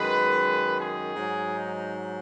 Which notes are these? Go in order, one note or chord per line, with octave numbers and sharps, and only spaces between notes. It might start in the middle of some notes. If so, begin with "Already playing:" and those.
Already playing: F#2 D#3 G#3 B4
G#4
G#2 F#3
D#4